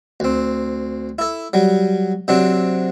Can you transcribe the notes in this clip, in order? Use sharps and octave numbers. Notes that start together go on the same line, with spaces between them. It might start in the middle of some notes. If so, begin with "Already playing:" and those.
D2 C4
E4 A4
F#3 G3
C3 F#3 C4 D4